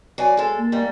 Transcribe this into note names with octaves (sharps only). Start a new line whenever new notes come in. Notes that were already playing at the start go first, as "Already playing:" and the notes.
F#3 D5 G#5
G#3 A4
A#3
G#2 G3